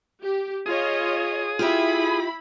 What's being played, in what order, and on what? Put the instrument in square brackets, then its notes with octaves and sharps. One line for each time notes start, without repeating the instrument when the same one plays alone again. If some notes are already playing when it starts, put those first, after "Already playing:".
[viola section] G4
[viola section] F4 C#5 D#5 [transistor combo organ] G#4 D#6
[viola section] E4 B5 [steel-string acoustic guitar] F4 G4 E5